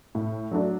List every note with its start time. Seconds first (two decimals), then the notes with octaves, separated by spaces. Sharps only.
0.15 A2
0.51 F#3 A3 D4